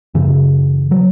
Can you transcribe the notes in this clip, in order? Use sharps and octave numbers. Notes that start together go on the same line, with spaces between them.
F#2 C#3 E3
F#3